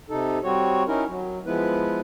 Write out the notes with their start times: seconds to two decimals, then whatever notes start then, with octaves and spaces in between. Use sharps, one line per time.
0.10 C3 D#4 A4
0.44 G3 C4 F#4 C#5
0.87 C#4 D#4 E4 A#4
1.08 F#3
1.46 F3 G#3 B3 E4 B4